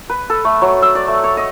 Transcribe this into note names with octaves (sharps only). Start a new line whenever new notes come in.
B4
A4
A3
F#3
E6
D5
A3
C#5
D#5